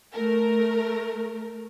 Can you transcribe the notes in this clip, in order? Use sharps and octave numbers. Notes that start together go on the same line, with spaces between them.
A3 A#4